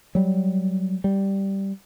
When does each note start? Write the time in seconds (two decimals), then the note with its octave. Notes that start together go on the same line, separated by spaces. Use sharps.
0.15 F#3 G3
1.04 G3